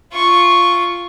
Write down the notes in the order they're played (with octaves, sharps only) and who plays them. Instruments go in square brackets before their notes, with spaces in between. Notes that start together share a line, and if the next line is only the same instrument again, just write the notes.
[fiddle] F4 C#6